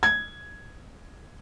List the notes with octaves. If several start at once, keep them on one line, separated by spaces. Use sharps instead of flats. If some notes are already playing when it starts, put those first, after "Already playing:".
G#6